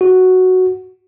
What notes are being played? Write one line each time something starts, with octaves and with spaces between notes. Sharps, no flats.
F#4